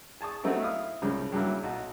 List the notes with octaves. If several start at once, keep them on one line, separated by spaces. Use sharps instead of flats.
G#4 A5 C#6 D#6
F#3 A3 B3 C4 D#4 E4
E4 F5 D#6
C2 G#2 C#3 F3
G2 C#3 F#3 A#3 E4
B1 D#4 F#4 A5